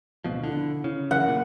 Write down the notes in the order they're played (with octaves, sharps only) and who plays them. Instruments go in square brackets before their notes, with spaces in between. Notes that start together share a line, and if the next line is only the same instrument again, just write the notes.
[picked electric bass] D1 B2 F3
[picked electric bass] D3 [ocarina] E4
[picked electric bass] C#3
[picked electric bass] F#2 C#3 E3 [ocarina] A#4 [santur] F#5
[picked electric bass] A#2